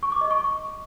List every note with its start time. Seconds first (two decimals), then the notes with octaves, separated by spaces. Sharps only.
0.03 C#6
0.12 D6
0.21 D#5
0.31 C#6